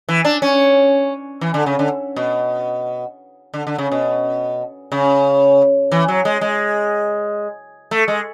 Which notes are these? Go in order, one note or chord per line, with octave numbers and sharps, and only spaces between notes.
E3
D4
C#4
E3
D3
C#3
D3
B2
D3
D3
C#3
B2
C#3
E3
F#3
G#3
G#3
A3
G#3